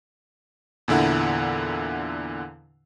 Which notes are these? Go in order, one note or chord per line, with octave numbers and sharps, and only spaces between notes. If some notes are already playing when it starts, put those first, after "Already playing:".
E2 A#2 D3 E4 F#5